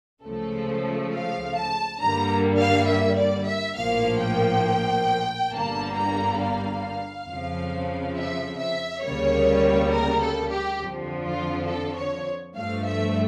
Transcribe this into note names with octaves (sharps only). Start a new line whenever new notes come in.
C#2 C#3 F3 A3 A4
F5
A5
G2 D3 G3 A#3 A#5
F5
E5
D5
E5
A#1 A2 F3 A#3 F5
G5
G1 G2 D3 G3 A#3 A5
A#5
F5
F2 C#3 F3
E5
E5
D2 C#3 G3 A#3 C#5
A#4
A4
G4
F2 D3 F3
F4
A4
C#5
G2 F3 A3 F5
E5